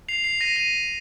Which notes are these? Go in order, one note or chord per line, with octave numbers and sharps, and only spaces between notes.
C7 F7
C7 F7
A#6 D#7
A#6 D#7